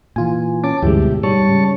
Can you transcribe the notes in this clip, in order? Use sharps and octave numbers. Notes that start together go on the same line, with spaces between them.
A#2 E3 F4 G#5
C#4 A5 D6
D2 G2 E3 G#3 E4 G4
B2
G#2 G3 C#5 A5 C#6
C#3